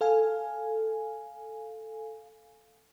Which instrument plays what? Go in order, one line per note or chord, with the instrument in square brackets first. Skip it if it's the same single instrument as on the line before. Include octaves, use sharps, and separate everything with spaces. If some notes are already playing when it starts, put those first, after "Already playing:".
[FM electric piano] A4 F5 G#5